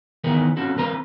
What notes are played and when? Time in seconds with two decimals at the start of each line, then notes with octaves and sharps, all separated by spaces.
0.24 D#3 E3 B3 D#4 G#4 A#4
0.57 C4 C#4 F#4 A4
0.76 E3 C4 A#4 B4 A#5